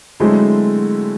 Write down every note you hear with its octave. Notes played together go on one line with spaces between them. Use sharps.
D3 F#3 G#3 A3 C4 E4